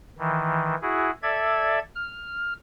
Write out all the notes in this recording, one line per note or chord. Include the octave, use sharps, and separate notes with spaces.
D#3 E3
E4 F#4 G#4
A4 D5 E5 G#6
F6